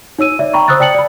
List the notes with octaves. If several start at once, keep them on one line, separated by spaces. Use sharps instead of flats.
D#4 C#5 E6 D#7
D5 E5
G5 A#5 B5 C#6
C5 D#6 E6 F#6 A6
D5 G5 A5 C#7 F#7
D5 B5